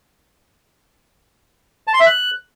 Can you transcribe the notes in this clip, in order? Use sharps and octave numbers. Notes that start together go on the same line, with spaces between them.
A5
C6
E5
F#6